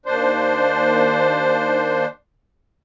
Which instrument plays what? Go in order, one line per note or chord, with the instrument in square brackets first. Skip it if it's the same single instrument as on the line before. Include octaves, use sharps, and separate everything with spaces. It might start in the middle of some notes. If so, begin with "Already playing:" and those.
[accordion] D#2 D4 C5